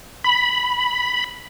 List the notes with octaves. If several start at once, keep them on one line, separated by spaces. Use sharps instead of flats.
B5